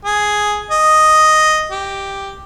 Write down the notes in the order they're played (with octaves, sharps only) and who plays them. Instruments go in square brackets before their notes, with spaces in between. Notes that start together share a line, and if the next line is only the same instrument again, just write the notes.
[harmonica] G#4
D#5
G4